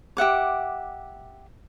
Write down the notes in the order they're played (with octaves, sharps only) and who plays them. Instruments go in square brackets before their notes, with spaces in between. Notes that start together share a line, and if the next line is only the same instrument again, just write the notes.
[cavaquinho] G4 E5 F#5 D6